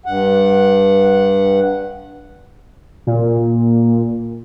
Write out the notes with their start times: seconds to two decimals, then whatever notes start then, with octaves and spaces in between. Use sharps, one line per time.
0.06 G2 F#5
3.07 A#2